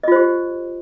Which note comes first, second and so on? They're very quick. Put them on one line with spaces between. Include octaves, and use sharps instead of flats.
D#5 F4 C5 G4